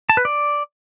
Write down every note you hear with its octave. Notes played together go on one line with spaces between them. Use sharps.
A5
B4
D5